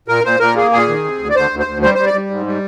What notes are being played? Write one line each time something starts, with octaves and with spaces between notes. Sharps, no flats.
A#2 A#4
A#2 C5
A#2 A#4
A#3 G#4
A#2 G#4
D#3
C3
D2
D5
D2 C5
D2
C5
D2
G3 C5
G3 C5
D5
G3
G#2
G3